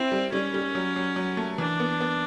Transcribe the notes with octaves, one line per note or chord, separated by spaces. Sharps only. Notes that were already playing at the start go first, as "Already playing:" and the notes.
Already playing: C4 E4
G3
G3 C#4
G3
F#3
F#3
F#3
A3
E3 D4
B3
B3